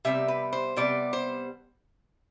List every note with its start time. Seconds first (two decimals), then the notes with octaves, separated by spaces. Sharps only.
0.05 C3 G3 B3 E5
0.28 B4
0.53 C5
0.76 C3 G3 B3 D5
1.13 C5